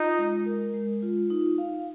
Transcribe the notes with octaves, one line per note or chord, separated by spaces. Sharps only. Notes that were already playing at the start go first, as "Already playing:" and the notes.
Already playing: D#4 F4
G#3
A#4
G#3
F4
D#4
F5